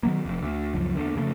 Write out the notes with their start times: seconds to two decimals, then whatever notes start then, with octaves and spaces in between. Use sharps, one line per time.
0.03 B2 D#3 F#3 A#3
0.25 F1 F2
0.42 D2
0.74 C#2 F#2 F3
0.95 E2 D3
1.15 F2 C#3 F#3 A3